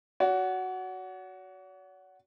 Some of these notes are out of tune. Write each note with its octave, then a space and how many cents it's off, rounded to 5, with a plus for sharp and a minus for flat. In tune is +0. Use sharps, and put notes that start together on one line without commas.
F#4 +5 C#5 +45